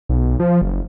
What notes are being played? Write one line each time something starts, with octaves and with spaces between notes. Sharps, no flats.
B1
F3
F#1